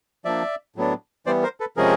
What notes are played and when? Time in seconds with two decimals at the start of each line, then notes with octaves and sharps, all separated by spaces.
0.25 F3 A#3 D4 D5 E5
0.76 A2 F#3 B3 D4
1.26 E3 G3 B3 C5 D5
1.43 A#4 C5
1.60 A4 B4
1.77 C3 F3 G#3 C#4 G#4 A#4